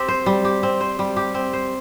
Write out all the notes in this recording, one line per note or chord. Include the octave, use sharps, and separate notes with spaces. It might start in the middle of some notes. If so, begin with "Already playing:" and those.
Already playing: C4 G4
C5
G3
G4
C4
C5
G3
G4
C4
C5